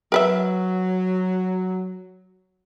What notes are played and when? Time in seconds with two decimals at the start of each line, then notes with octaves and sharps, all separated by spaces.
0.12 F#3 A#4 B4 E5